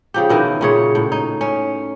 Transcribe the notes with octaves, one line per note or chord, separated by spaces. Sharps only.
C#3 F3 G4
B2 D#3 E3 F#3
A#2 C#3 C#5
A2
D#4
C#4